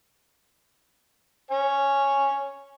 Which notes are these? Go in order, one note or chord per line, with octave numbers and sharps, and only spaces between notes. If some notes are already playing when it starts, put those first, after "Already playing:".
C#5 G#5